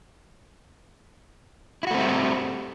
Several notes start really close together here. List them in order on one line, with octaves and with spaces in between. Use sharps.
E4 F#4 A3 C4 G3